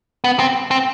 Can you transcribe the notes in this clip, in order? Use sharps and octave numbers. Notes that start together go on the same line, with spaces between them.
B3
C4
C4